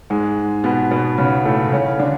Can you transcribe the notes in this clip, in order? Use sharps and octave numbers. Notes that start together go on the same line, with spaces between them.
G#2 G#3
B2 B3
B2 B3
C#3 C#4
A2 A3
C#3 C#4
D3 D4